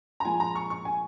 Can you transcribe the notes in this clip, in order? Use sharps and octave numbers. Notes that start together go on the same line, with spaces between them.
A#5
A#2 F3 G#3 G#5
A#5
C#6
C#6
G#5